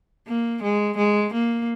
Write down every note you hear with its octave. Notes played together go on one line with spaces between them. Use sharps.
A#3
G#3
G#3
A#3